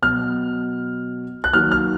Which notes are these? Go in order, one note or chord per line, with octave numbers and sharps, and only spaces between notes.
B2 F#3 B3 F6
F#6
D#3 F#3 A#3 F6
F6